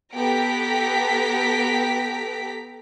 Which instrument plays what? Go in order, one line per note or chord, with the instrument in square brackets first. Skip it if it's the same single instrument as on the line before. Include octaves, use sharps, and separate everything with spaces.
[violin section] B3 G4 A4 A#5 B6 D7